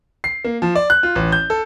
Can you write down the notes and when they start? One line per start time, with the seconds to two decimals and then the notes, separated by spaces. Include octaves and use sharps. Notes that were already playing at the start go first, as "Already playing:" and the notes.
0.24 C7
0.44 A#3
0.62 F3
0.75 D5
0.90 F#6
1.03 F4
1.15 A1
1.32 G6
1.50 A4